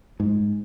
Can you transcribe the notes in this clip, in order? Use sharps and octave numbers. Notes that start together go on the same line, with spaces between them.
G#2